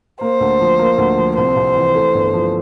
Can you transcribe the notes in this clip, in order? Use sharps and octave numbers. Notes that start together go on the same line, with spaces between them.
A#3 C5
D2
F3
A#3
D2
F3
C2 C5
C2
E3
A3
G1
F3